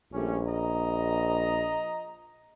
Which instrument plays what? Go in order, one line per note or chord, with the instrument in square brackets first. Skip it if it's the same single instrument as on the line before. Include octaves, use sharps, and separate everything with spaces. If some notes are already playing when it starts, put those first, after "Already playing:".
[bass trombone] A#1 [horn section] G3 A3 C#4
[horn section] D#5 A#5